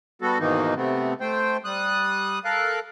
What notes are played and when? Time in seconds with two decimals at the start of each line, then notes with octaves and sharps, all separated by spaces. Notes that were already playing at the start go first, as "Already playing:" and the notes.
0.22 G3 B3 F#4 A4
0.39 G#2 B2 D#3 E3 A#3 D#4
0.76 C3 A3 B3 C4
1.21 A3 C5 G5
1.65 G3 D#6 F#6
2.45 A4 A#4 F5 F#6